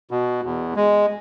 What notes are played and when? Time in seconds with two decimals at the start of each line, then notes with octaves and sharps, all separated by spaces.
0.11 B2
0.44 E2
0.76 G#3